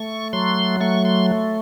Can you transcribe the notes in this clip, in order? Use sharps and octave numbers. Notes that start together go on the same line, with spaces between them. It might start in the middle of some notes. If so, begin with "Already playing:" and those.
Already playing: A3 C#6
F#3 C6
A3 C#6
C6